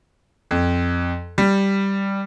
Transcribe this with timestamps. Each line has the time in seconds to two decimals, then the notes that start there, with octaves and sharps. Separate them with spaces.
0.51 F2
1.38 G3